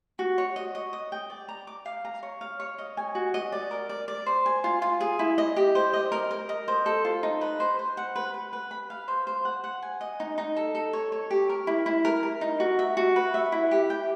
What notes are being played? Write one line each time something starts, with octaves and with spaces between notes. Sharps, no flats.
F#4
C#5
D#5
D#5
D#6
G5
D5
A#5
D6
F5
A#5
C#5
F5
C#5
D#5
G#5
F#4
D#5
D5
A#4
D5
D5
C5
G#5
F4
F4
G#4
E4
D#5
G4
C5
D#5
A#4
A#4
D#5
C5
A4
F4
D#4
B4
C5
C5
F#5
B4
B4
B4
B5
F5
C5
C5
F#5
F#5
G#5
D#5
D#4
D#4
A4
A4
C#5
C#5
G4
A#4
E4
E4
A#4
A#4
D#4
F#4
E5
F#4
B4
E5
E4
G4
G5